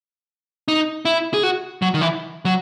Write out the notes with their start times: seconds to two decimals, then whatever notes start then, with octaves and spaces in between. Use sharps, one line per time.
0.68 D#4
1.05 E4
1.34 G#4
1.43 F#4
1.82 F#3
1.94 D#3
2.01 E3
2.45 F#3